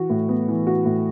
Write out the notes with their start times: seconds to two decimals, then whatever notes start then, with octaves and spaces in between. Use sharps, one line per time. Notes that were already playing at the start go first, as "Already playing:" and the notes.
Already playing: E3 F#4
0.10 A2
0.29 B3
0.48 E3
0.67 F#4
0.85 A2